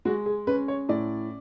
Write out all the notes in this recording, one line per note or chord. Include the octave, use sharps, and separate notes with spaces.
G#3 F#4
G#4
C#4 B4
C#5
A2 D5